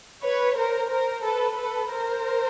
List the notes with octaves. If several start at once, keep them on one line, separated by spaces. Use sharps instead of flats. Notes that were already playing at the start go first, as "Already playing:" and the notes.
B4 C#5
A#4 C5
A#4 C5
A4 B4
A4 B4
A#4 C5